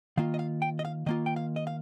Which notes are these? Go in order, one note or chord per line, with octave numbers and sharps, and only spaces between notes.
D#3 A#3 F4 F5
D#5
F5
G5
D#5
F5
D#3 A#3 F4 D#5
G5
F5
D#5
F5